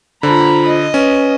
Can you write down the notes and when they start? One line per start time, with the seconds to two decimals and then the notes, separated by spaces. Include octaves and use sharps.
0.23 D3 F4 C5 A#5 B5
0.65 D#5
0.94 C#4 B4